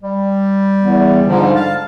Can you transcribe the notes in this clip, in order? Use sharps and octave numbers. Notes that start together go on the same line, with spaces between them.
G3
E2
G#2 D3 F3
F5 A5